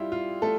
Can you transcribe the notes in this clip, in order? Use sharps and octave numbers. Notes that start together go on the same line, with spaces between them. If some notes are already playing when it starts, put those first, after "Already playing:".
Already playing: G3 E4 F4 G4
F4
A3 A4